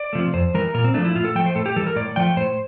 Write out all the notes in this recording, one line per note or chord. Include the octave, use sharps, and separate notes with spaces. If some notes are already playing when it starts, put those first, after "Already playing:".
Already playing: D5
C3 F3 A3
F2 C5
E3 G3 A#4
A#2 A#4
C4
F3 A3 D4
E4
A2 F4
A4
F3 A3 G5
C5
A2 A4
G4
E3 G3 A4
A#4
A2 D5
F3 A3 G5
A2 C5